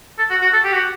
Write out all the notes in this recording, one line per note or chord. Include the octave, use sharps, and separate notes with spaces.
A4
F#4
F#4
A4
G4
F#4